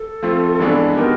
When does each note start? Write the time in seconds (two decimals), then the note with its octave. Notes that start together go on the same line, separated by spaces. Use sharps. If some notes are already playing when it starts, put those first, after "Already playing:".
Already playing: A4
0.22 F3 A3 C4 F4
0.59 G2 E3 G#3 B3 D4
0.97 B2 G#3 B3 D#4 G4 A#4